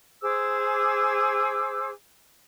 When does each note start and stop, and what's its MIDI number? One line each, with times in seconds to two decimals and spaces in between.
0.21 1.89 68
0.21 1.89 72
0.21 1.89 86
0.21 1.89 88